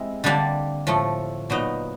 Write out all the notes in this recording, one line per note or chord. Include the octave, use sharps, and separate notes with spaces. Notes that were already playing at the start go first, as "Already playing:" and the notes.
Already playing: G#3 C4 E4 G4
D3 G3 A#3 D4 G4
A2 F3 A3
A#2 F#3 B3 D#4